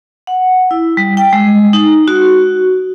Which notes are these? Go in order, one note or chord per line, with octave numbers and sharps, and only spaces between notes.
F#5
E4
G3
G5
G#3
D#4
F#4